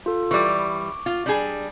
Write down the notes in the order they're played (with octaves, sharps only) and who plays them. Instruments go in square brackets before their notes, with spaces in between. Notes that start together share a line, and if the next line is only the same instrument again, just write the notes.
[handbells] F4 A4
[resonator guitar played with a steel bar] E3 G3 [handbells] C#6 D6
[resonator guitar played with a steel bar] F4
G3 D4 G#4